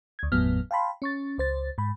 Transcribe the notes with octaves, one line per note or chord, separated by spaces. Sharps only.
D2 G#6
G1 E2 A2 F#3 B3 F6
F5 G5 A5 B5 C6
C#4 C#6 A6
C#2 C5 A6
G#2 B5